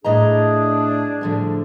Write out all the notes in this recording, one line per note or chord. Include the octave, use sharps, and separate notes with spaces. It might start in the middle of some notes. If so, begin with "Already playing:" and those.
A2 D4 G#4 D#5 A#5
A2 D3 F3